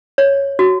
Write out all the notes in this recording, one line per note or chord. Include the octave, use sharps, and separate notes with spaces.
C#5
F#4